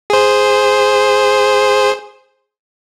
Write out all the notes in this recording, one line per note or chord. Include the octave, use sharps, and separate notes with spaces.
G#4 C5